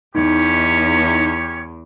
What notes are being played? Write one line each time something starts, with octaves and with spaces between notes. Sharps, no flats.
E2 C#4 D#4 G4 C#5